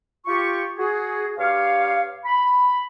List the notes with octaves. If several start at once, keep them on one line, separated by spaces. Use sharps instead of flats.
F4 G4 C#6
F#4 G#4
G2 G4 C#5 F5
B5